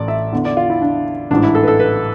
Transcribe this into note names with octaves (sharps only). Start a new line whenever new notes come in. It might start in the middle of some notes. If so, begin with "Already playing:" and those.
Already playing: A1 D5
E5
E2 D3
D5
F4
E4
D4
A1 G#2 E3 D4
E4
A4
B4
A4
B4